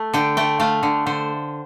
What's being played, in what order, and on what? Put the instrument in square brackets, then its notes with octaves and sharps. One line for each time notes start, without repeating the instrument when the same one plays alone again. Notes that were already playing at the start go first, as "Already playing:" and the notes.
Already playing: [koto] A3
D3 G5
A3 G5
A3 F5
D3
D3 C5